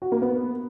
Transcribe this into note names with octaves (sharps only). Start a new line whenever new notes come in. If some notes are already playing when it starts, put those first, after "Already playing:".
F#4
A#3
B3